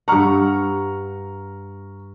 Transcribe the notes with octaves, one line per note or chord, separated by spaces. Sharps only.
G2 F#5 A#5 C#6 F6